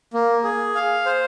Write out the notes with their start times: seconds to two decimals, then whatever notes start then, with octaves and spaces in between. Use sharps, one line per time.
0.14 A#3
0.44 G#4
0.75 F5
1.06 C5